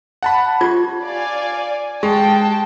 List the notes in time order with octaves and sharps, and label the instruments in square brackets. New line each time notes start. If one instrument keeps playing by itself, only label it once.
[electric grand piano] F#5 A5 B5
[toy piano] F4 G4 [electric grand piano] G#6
[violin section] D5 F5 G#5
[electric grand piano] G#3 [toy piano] G4 [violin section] G5 A5